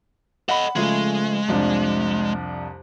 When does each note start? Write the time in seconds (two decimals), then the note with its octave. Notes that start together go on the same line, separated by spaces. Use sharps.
0.49 A4 D#5 F#5 B5
0.76 C#3 F3 G#3 A3
1.48 C2 F2 D4